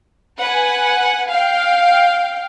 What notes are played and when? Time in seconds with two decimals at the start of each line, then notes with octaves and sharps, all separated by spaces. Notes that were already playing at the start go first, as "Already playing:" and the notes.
0.39 B4 F#5 G#5
1.30 F5 G5